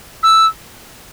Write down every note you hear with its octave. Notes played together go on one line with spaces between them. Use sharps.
E6